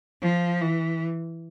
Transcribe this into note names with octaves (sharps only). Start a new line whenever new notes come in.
F3
E3